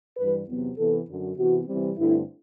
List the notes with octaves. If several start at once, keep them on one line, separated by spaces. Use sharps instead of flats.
G2 E3 G3 B4
E2 C3 F#3 B3
C3 E3 B3 A4
F#2 D3 F#3
C3 E3 B3 F#4
C3 E3 G3 C4
G2 D3 A3 C4 E4